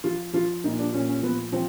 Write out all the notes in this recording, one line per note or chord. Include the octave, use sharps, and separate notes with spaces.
F3 F4
F3 F4
A#2 D#4
D4
A#2 C#4
C#4
F3 B3
F3 C4